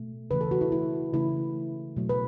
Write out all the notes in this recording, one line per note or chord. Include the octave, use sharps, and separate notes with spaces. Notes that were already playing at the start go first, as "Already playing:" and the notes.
Already playing: B2 A3
C#3 E3 A3 B4
A4
F#4
E4
E4
C#3 E3 A3 E4
B2 F#3 A3
B4